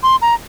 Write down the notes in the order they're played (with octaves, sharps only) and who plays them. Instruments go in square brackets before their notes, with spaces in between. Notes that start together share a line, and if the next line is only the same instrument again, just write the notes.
[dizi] C6
A#5